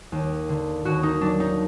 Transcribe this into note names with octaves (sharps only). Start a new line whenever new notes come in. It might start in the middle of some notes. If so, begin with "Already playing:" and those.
D#2
D3
D#2 F#4
D#4
F#3 D4
D#4